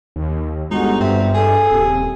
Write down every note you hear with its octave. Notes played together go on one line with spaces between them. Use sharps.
D#2
G1 G#3 D#4 F#4
G2 C4 E5
G#4 A4
D#1 C3